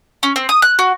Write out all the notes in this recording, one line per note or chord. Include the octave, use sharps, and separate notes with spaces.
C#4
C4
D#6
F#6
F#4